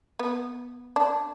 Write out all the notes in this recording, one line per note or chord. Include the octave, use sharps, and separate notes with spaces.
B3
D4